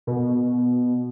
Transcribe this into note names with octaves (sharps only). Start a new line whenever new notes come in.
B2